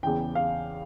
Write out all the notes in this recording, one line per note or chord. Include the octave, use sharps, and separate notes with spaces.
E2 C#3 E3 G5
F5